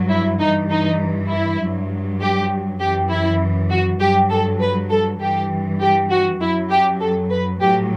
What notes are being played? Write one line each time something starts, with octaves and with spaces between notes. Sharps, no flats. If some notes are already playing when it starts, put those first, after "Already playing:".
Already playing: G2 F#3
E4
G2 E3 D#4
D#4
E4
G2 F#3
G4
F#2 E3 G4
E4
F#4
G2 F#3 G4
A4
B4
A4
G2 E3 G4
G4
F#4
F#2 F#3 E4
G4
A4
B4
F#3 G4
A2